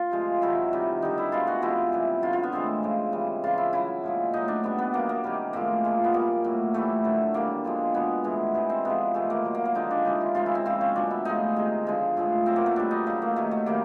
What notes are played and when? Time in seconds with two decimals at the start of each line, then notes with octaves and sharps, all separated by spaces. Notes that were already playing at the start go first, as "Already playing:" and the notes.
Already playing: F4
0.11 C3 F3 G#3
0.42 C3 D#3 F#3 E4
0.73 C3 D#3 G3
1.02 D3 G3 D#4
1.18 E4
1.32 B2 G#3 F4
1.47 F#4
1.62 C3 F3 G#3 E4
1.92 C3 E3 G3
2.22 D3 F#3 F4
2.33 F4
2.43 B3
2.52 A2 E3 G#3 C4
2.83 C#3 F3 G#3
3.12 C#3 E3 G3
3.44 C#3 E3 G3 F4
3.58 E4
3.73 C#3 F#3 E4
4.03 A#2 F3 G#3
4.34 A2 F#3 D#4
4.48 D4
4.63 B2 G3 B3
4.79 B3
4.93 B2 F#3 A#3
5.09 A#3
5.24 C3 D#3 G3
5.53 A2 F3 G#3 A#3
5.84 A#2 F3 G#3
6.04 B3
6.14 A#2 G3 A#3
6.44 A2 F#3
6.74 A2 E3 G3 A3
7.04 D3 F#3
7.34 B2 G3 A#3
7.64 D3 F3 G#3
7.94 B2 G#3 B3
8.24 A2 E3 G#3
8.54 C3 E3 G#3
8.70 C4
8.85 C3 F3 G#3 B3
9.14 C3 E3 G#3 A3
9.30 A#3
9.45 B2 F#3
9.55 A#3
9.65 A#3
9.75 D3 F3 G#3 D#4
9.91 D4
10.05 C3 E3 G#3 D#4
10.21 F4
10.35 C#3 F3 G#3 F4
10.46 E4
10.55 C4
10.66 C#3 F3 G#3 C4
10.81 C#4
10.95 B2 F#3 D4
11.11 E4
11.25 A2 F3 G#3 D#4
11.56 C3 D#3 G#3
11.86 D3 F3 G#3
12.17 A2 F3 G#3
12.46 B2 F#3 C4
12.56 A#3
12.66 A3
12.76 B2 G3 D4
12.91 D#4
13.06 C#3 F#3 A3
13.22 A#3
13.36 C3 D#3 F#3 A3
13.51 A3
13.66 C3 D#3 G3 A#3